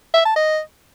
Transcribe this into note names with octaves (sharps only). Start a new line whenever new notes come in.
E5
A5
D#5